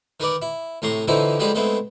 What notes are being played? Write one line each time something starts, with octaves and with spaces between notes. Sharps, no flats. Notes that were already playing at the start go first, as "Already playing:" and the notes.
D#3 A#4 B4 D5
E4
A2 C3 A#5 C6 C#6
D3 E3 F3 C4 D#4 E4
D3 F3 G3 G#3 G#4 B4
G#3 A3 B3 C4 E4